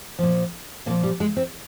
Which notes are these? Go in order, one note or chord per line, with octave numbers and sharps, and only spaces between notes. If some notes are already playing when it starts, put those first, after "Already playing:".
A#2 F3
A#2 F3 A#3
G3
G#3
C4